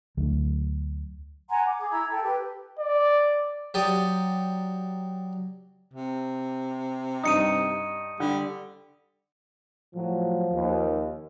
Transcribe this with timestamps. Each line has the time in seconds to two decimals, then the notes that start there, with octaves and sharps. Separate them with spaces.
0.17 D2 D3 F#3 A3
1.49 F#5 G#5 A#5 C6
1.65 D6
1.78 G#4
1.90 E4 A#5 E6 G#6
2.11 A4 G5
2.23 G4 B4
2.79 D5
3.74 F#3 G4 D5 D#6
5.94 C3
7.24 G2 D#4 D#6 C#7 D#7
8.20 D3 G3
9.95 A2 F3 F#3
10.52 D#2